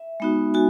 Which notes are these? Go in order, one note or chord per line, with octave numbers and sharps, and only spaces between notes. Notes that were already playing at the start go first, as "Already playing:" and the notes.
Already playing: E5
G#3 B3 D#4 F#4
F#4 G#5